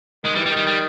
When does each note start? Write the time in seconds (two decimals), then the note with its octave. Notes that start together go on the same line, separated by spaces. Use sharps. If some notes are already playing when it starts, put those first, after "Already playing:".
0.24 D#3 G#3
0.35 E3 G3
0.46 G3
0.51 D#3
0.56 G3
0.67 G3